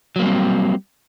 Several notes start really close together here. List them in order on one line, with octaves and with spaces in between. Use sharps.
F#3 A#3 G3 C4